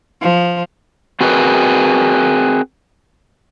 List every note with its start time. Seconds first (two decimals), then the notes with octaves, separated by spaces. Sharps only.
0.21 F3
1.21 C4 F#4 G#4 A#4 B4